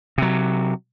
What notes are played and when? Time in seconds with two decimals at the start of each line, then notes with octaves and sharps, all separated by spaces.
0.18 C3 F#3